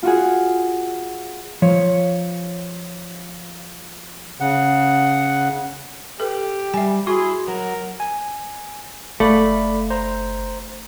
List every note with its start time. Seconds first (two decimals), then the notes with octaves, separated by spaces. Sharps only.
0.03 F4 F#4 G#4
1.62 F3 C#5
4.40 C#3 F#5
6.20 G4 A4 B4
6.74 G3 E5 G#5
7.07 E4 F#4 G#4 C6
7.48 F#3 A#4
8.00 G#5
9.20 F#1 A3 D5 F5 B5
9.90 C5 A#5